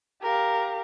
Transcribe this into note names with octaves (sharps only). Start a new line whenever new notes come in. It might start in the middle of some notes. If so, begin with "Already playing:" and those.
G4 A#4 F5